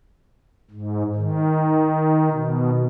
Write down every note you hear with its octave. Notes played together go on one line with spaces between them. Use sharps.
G#2
D#3
B2